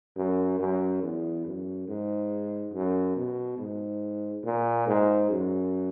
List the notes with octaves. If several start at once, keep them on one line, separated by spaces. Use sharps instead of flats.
F#2
F#2
E2
F#2
G#2
F#2
B2
G#2
A#2
G#2
F#2